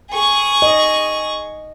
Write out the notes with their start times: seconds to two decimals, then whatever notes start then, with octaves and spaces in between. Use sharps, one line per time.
0.11 G#4 C#6
0.62 D#5